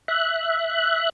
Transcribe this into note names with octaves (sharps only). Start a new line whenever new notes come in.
E5 F#6